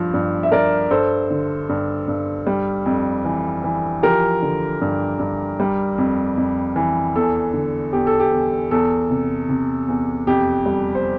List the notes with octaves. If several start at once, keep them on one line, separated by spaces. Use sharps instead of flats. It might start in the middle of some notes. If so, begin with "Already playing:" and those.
Already playing: G2 F3
G2
E5
G2 A#4 D5
G2 A4 C5
D3
G2
G2
G3
F2
E3
E3
F3 G4 A#4
D3
G2
G2
G3
F2
F2
E3
E2 A4
D3
E2 G4
A4
G4
E2
E2 A4
C3
C3
E2
F2 G4
G3
C5